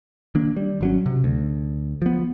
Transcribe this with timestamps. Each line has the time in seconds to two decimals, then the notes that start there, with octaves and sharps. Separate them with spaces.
0.35 D#3 A#3 D4
0.56 G3
0.81 G#1 F#3 C#4
1.06 C3
1.24 D2
2.02 F3 B3